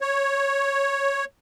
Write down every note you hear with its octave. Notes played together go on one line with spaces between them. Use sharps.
C#5